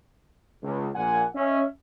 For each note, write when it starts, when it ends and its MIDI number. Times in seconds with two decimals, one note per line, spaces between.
0.63 0.88 37
0.95 1.24 34
0.95 1.24 46
0.95 1.24 78
0.95 1.24 80
1.35 1.62 61
1.35 1.62 75
1.35 1.62 76